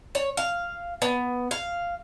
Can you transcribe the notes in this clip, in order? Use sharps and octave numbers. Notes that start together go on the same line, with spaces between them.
C#5
F5
B3
F5